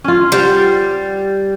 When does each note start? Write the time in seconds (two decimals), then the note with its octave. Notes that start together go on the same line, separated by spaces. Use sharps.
0.04 C#4 F4
0.32 G3 C5 F#5